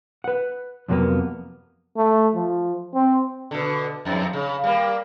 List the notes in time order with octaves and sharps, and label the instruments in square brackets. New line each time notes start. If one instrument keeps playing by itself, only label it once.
[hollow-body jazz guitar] B4 F#5
F2 C3 F#3 G#3 A#3 B3
[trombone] A3
F3
C4
[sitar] B2 D3
F2 G#2 C4
C#3
G3 A#3